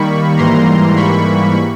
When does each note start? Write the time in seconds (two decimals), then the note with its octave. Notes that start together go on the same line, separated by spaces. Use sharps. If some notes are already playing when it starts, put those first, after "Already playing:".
Already playing: D#3 G3 A#3 B5 C#6
0.37 G#2 E3 G3 A#3 A#5 C6
0.96 B5 C#6